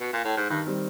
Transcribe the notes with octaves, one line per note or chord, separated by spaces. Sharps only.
B2
A#2
A2
G#2
G2 D#3
G3 C4